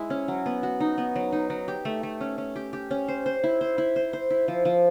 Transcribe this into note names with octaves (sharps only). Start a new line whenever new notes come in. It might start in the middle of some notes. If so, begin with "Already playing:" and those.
Already playing: G#3 E4
C#4
F#3
B3
F#4
D#4
B3
F#3
D#4
F#3
G4
A3
A3
C#4
C#4
G4
G4
C#4
C5
C5
E4
C5
E4
C5
C5
E4
F3
F3